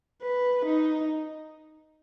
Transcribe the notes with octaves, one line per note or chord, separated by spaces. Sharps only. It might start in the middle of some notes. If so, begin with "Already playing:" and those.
B4
D#4